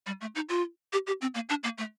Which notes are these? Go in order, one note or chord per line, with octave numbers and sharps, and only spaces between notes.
G3
A3
D#4
F4
G4
G4
C4
A#3
D4
A#3
A3